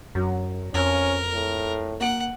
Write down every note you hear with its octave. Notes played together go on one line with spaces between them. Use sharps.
F#2 F#3
F2 C#4 A#4
A2
A#3 F#5 D7